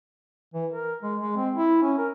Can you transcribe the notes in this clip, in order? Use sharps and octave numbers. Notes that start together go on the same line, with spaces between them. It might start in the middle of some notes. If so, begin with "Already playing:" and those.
E3
A#4
G#3
G#3
C4
E4
C#4
A#4